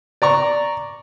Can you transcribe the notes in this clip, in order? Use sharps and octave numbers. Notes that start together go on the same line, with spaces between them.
D5 A#5 C#6